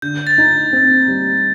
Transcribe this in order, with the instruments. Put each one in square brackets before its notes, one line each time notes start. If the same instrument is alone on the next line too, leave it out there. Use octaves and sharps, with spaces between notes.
[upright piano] D3 [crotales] G6
[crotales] A6
[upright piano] D#4
C4
G3